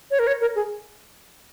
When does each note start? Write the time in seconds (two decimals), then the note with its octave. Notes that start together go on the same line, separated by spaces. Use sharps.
0.11 C#5
0.19 A#4
0.27 C#5
0.41 A#4
0.56 G#4